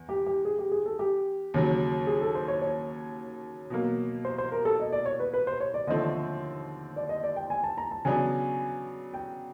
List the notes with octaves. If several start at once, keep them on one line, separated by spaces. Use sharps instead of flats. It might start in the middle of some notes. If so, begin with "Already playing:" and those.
Already playing: E2
G4
G4
G#4
G4
G#4
A4
G4
D#2 C#3 F#3
G#4
A4
C5
C#5
C#5
B2 F#3 A#3
C5
C5
A#4
A4
D#5
D5
C#5
B4
B4
C5
C#5
D5
D#2 D3 F3 A3 C4 D#5
D5
D#5
D5
G5
G#5
A5
A#5
A5
C#3 F#3 B3 D4 G#5
G5